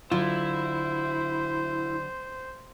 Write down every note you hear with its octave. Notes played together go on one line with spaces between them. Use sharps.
D3 F#3 E4 F4 C5